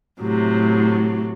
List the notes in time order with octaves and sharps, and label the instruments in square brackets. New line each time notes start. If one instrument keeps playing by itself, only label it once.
[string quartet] A2 C3 F#3